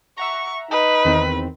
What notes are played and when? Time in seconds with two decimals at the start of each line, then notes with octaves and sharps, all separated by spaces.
0.18 E5 F#5 A#5 C#6
0.71 D#4 B4
1.05 E2 D#3 C4